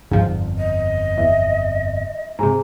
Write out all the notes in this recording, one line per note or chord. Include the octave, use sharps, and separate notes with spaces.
G1 F2 G#2 F3
D#5
E2 E5
G#2 C3 G#4 G#5 A#5